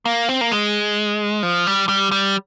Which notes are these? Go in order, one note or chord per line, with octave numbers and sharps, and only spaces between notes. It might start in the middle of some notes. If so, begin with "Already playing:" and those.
A#3
C4
A#3
G#3
F3
G3
G3
G3